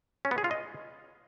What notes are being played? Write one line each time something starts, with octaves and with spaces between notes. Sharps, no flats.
C#4
B3
G#4
F4
D#5